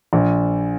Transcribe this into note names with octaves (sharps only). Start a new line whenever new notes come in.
A#1